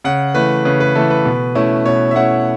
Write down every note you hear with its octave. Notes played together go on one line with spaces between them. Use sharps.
C#3 F#5
E3 A3 B4
C#3 B4
B4
E3 A3 A4
B4
B2
A3 C#4 E4
B2 C#5
E5
A3 C#4 E4 F#5